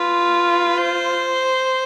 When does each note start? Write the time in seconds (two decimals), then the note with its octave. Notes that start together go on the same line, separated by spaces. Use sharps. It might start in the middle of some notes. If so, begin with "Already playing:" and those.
Already playing: F4 B4
0.77 C5